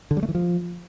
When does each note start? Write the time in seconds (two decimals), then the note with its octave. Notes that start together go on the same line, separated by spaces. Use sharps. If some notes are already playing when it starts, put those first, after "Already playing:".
0.11 D3
0.17 G3
0.23 A3
0.29 E3
0.35 F3